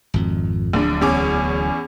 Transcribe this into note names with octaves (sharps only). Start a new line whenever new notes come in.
G#1 F2
D1 A#1 D4
E2 C#4 D6